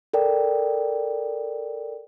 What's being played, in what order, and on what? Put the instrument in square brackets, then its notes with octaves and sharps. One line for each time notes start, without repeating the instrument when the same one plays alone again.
[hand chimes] A4 A#4 D5 G5